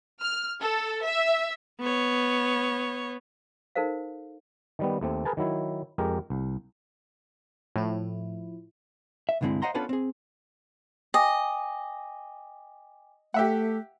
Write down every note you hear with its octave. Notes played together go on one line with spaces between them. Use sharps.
F6
A4
E5
B3 C#5
D#4 A4 A#4 C5 F5
D#3 G3 B3
D#2 A3 C4
G#4 A#4 B4 G#5 A5
D#3 F#3 E4
F2 G#3 G4 A#4
C2
A2 F3 E4
E5
C2 G2 D3 G#3 C4 E4
C5 D#5 F5 F#5 A#5 C6
B3 C#4 D4 F4 A4 B4
C4 G#4
D#5 G5 G#5 D6
A3 G4 E5 F#5